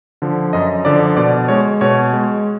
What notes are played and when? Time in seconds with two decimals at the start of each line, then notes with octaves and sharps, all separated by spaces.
0.22 D3 F3
0.53 F#2 D#5
0.85 D3 F3 D5
1.17 B2 D5
1.48 G#3 C#5
1.81 B2 C#5
2.13 G#3